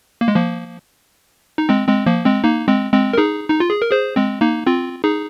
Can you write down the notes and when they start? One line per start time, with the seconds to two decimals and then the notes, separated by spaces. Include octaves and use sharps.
0.21 A#3
0.28 G#3
0.35 F3 A#3
1.58 D#4
1.69 G#3 C4
1.88 G#3 C4
2.06 F3 A#3
2.25 G#3 C4
2.44 A#3 D#4
2.68 G#3 C4
2.93 G#3 C4
3.13 A#4
3.18 D#4 G#4
3.50 D#4
3.60 F4
3.71 G#4
3.82 A#4
3.92 G#4 C5
4.16 G#3 C4
4.41 A#3 D#4
4.67 C4 F4
5.04 D#4 G#4